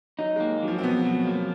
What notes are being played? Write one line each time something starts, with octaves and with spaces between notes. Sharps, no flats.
F#3 D#4
G#3
A#3
F#3
F3
C4
B2 B3
F#3
A#3